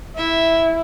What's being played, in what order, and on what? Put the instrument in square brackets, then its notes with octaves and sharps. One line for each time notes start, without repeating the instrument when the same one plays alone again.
[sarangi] E4 [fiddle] E5